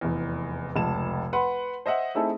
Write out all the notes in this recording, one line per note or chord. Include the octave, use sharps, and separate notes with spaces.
F1 E2
F1 C#2 A5 E7
B4 F#5 B5 C6
C5 D#5 E5 F#5
A3 C4 D#4 E4 G#4 A4